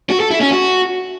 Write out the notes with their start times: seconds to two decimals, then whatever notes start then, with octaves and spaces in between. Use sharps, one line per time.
0.10 F#4
0.20 A4
0.30 E4
0.41 C#4
0.51 F#4